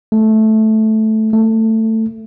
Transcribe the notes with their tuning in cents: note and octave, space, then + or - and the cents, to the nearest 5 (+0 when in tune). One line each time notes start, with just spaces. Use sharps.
A3 -10
A3 +15